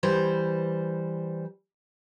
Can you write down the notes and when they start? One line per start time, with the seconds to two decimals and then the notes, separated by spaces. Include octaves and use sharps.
0.03 E3 G3 C5